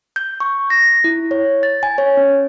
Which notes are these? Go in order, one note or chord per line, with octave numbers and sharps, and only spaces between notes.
G6
C#6
A#6
E4
C#5
A6
G#5
C#5
C#4